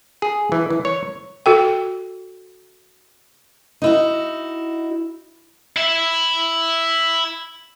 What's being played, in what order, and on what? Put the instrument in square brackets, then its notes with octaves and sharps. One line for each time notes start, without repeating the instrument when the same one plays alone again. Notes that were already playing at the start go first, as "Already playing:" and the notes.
[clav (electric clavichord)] G#4
E3
E3
C#5
[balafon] F#4 A4 G5
[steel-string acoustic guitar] D#4 E4 F#4
[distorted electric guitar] E4 E5